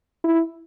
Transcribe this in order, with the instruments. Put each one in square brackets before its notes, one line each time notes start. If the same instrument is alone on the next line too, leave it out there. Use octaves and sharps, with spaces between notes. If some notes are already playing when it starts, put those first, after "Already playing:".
[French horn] E4